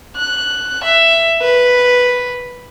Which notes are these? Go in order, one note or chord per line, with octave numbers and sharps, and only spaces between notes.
F#6
E5
B4